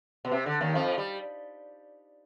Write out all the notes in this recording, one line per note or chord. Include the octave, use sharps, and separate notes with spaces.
B2
C3
D3
D#2 D#3
F2 F3
G3